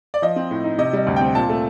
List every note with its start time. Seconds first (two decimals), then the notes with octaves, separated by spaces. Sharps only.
0.14 D5
0.22 F3 D#5
0.36 C4
0.51 A2
0.64 D#4
0.78 C3 D#5
0.93 G3 D#5
1.07 D2
1.16 C4 G5
1.35 A#2 A5
1.49 A3